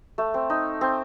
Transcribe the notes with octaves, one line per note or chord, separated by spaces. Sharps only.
A3
C4
D#4
C4